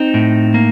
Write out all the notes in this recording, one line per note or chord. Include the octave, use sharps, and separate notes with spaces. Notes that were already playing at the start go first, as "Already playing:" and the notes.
Already playing: C4 D#4
A2
A#3